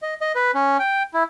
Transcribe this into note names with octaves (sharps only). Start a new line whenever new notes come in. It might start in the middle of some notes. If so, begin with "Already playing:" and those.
D#5
D#5
B4
C#4
G5
E4